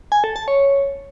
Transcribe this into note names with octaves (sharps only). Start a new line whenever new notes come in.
G#5
A4
A5
C#5